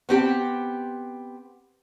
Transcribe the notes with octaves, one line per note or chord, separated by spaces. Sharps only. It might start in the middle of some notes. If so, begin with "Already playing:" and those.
B3 C4 G4